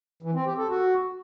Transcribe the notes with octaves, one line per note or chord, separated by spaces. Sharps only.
E3
C4
G4
A4
F#4